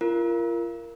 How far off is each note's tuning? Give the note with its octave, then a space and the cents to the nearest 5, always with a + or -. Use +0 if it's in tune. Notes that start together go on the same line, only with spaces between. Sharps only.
F4 -35 A#4 +0